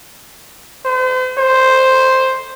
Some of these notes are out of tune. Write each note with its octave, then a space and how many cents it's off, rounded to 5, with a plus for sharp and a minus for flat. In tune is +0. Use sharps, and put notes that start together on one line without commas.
C5 -40
C5 +0